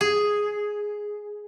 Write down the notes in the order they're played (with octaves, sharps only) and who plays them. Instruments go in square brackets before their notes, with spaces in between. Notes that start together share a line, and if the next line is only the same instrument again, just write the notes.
[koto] G#4